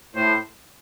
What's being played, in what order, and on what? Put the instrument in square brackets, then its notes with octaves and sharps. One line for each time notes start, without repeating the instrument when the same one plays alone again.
[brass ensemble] A2 [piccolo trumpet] C5